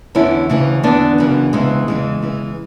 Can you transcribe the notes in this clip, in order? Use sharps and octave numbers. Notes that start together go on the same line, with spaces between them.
E2 D3 C#4 E4
D2 C#3 E3
E2 D3 B3 D4
F#2 C#3 E3
D2 C#3 E3 G#3 B3
E2 C#3 E3 G#3
E2 C#3 E3